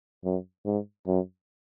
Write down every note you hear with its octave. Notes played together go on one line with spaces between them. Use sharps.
F#2
G#2
F#2